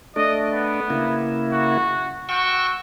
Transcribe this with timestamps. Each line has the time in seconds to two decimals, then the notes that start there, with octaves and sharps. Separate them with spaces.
0.16 A3 D4 D#5
0.52 B3
0.90 C#3 A#3 E4
1.52 F#4
2.29 F#4 G5 C#6 E6